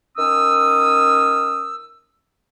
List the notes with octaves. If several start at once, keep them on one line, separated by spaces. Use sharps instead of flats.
D#3 C#4 D#6 E6